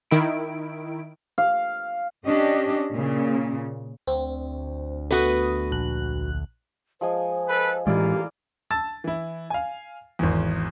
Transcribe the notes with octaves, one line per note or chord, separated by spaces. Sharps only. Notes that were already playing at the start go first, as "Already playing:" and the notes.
D#3 E4 D7
F5
C#4 D4 G4 D#5
A#2 C#3
D2 C4
A3 B3 F#4 B4 D#6
A#1 F#6
F3 G#3 C5 G#5
A4 B4
A2 E3 G#3 A#3 E4 F4 G4 D5
A5 E6 A6
E3 E4
F5 G#5
G#1 E2